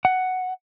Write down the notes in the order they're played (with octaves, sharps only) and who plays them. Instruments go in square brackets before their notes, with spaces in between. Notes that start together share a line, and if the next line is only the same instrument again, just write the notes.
[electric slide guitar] F#5